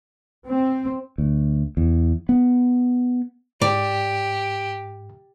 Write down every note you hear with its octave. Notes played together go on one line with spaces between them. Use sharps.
C4
D2
E2
B3
G#2 G4 D5